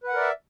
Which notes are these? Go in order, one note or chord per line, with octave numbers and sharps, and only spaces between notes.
A#4 B4 D5 E5 F#5